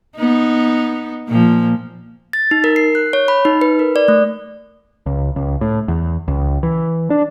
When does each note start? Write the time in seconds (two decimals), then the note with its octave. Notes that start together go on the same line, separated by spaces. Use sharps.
0.17 B3 D#4
1.28 A#2 F3
2.33 A6
2.51 D#4
2.64 A#4
2.76 C7
2.95 F#6
3.13 C#5
3.28 B5
3.45 D#4
3.61 B4
3.79 A#4
3.96 D5
4.08 A3
5.06 C#2
5.36 C#2
5.61 A2
5.88 E2
6.28 C#2
6.63 E3
7.10 D4